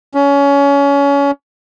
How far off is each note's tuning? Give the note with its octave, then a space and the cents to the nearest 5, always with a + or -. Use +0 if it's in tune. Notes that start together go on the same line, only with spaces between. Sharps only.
C#4 +25